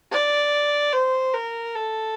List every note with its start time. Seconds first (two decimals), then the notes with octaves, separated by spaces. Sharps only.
0.12 D5
0.93 C5
1.34 A#4
1.75 A4